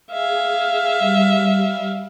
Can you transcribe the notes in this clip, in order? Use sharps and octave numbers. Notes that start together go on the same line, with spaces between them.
G#4 E5 F5
G3